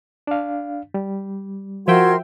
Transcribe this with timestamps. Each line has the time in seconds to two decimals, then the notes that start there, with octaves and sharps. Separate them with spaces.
0.27 D4 F5
0.94 G3
1.88 F3 F#4 A#4 E5 G5 C6 G#6